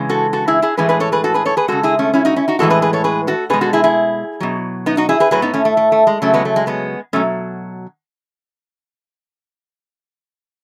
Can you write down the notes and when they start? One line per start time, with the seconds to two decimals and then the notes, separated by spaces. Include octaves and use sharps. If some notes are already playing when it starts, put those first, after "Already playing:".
Already playing: C#3 E3 G#3
0.09 F#4 A4
0.33 F#4 A4
0.48 E4 G#4
0.62 E4 G#4
0.77 A2 E3 G#3 G#4 B4
0.89 G#4 B4
1.00 A4 C#5
1.12 G#4 B4
1.24 F#4 A4
1.34 G#4 B4
1.45 A4 C#5
1.57 G#4 B4
1.68 C#3 G#3 F#4 A4
1.83 E4 G#4
1.99 A3 C#4
2.14 C#4 E4
2.25 D#4 F#4
2.36 C#4 E4
2.48 D#4 F#4
2.59 A2 E3 G#3 F#4 A4
2.70 G#4 B4
2.82 G#4 B4
2.93 A4 C#5
3.04 G#4 B4
3.27 F#4 A4
3.50 B2 G#4 B4
3.54 G#3
3.61 F#4 A4
3.73 E4 G#4
3.84 E4 G#4
4.40 B2 F#3
4.86 B3 D#4
4.97 D#4 F#4
5.09 E4 G#4
5.20 G#4 B4
5.31 A2 F#3 G#4 B4
5.42 B3 D#4
5.54 A3 C#4
5.65 A3
5.77 A3
5.92 A3
6.07 G#3
6.22 C#3 F#3 A3
6.34 G#3 B3
6.45 A3
6.56 G#3
6.67 G#3 B3
7.13 B2 F#3 A3 C#4